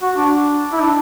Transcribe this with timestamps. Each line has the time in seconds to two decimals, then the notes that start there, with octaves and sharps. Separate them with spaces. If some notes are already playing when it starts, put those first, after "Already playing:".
0.02 F#4
0.16 D4
0.72 E4
0.82 D4